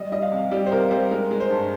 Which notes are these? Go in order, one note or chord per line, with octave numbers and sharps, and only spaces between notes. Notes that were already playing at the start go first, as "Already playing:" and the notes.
Already playing: G3 D#5
G3 D#5
F5
C3
G3 G4
C5
C3 A#4
G3 C5
G#3 A#4
G#3
C5
G2